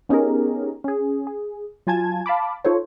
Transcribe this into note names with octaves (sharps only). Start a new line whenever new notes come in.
B3 C#4 D#4 G4 G#4 A#4
C#4 G#4
G#4
F#3 F4 G#5 A5 G#6
F5 A5 B5 D6
D#4 F4 A4 C5 C#5